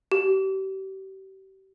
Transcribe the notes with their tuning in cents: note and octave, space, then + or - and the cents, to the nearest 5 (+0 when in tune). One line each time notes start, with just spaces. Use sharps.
G4 -35